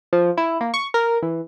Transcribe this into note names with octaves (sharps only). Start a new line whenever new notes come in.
F3
E4
A#3
C#6
A#4
E3